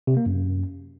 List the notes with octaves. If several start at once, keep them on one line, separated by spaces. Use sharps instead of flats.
C3
A#3
F#2